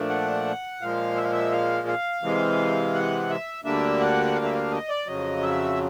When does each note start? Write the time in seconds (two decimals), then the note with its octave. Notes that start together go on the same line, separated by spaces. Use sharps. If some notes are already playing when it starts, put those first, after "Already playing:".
Already playing: A#2 F3 A3 D4
0.10 F#5
0.81 A#2 F3 G#3 F5
1.17 E5
1.24 F5
1.32 E5
1.52 F5
1.88 F5
2.23 C3 E3 G#3
2.94 F#5
3.30 E5
3.65 D2 D3 G3 A#3 D4 E5
4.01 F#5
4.36 F5
4.45 E5
4.54 F5
4.71 D#5
4.89 D5
5.06 F2 C#3 F#3 D#5
5.42 E5